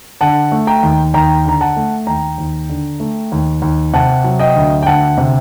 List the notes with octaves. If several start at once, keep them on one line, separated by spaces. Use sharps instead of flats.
D3 F#5 A5
A3
G5 A#5
D#2
D#2 G5 A#5
D3 A#5
F#5 A5
A3
D#2 G5 A#5
D#2
D3
A3
D#2
D#2
C3 F#5 A5
F#3
D#5 G5
D2
G5
D2 F#5 A5
C3